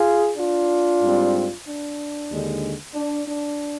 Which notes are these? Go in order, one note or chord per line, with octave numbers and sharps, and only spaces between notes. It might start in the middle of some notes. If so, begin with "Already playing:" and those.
Already playing: F4 G#4
D4 F4
G#2 G3 C4
D4
D#2 D3 G#3
D4
D4